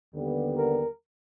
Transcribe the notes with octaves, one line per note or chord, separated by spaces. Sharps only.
D#2 D3 G3 B3
A#4